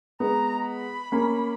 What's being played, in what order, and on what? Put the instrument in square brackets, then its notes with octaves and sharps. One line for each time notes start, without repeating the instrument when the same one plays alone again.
[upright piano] G#3 B3 [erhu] A#5
[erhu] B5
[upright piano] A#3 C#4